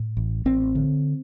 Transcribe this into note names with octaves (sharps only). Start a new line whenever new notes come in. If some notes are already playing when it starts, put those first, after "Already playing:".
Already playing: A2
A1
A1 C4
D3